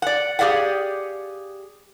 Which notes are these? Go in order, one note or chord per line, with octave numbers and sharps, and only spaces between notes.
D5 F#5
G4 G#4 D5 F5 F#5